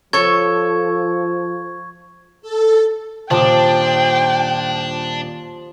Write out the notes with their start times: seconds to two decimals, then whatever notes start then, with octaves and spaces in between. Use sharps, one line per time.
0.13 F3 A4 C#5 C#6 G#6
2.42 A4
3.31 D#1 F3 D4 G5 A5 D6 D#6